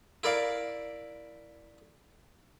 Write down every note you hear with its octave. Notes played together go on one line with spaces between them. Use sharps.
E4 A#4 D5 F5